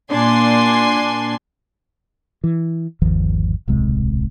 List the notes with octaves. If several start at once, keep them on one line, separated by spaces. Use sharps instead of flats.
A#2 D4 G#5 C6
E3
G1 D#2 D#3 F3
D1 B1 C3 G#3